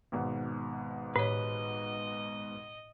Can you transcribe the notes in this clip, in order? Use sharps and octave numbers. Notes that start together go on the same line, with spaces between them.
G#1 G#2 B2
A2 B4 C#5 D#5